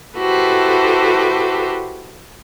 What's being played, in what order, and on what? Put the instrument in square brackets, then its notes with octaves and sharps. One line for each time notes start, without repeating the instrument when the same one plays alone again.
[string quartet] E4 F#4 G4 A4 B4 C5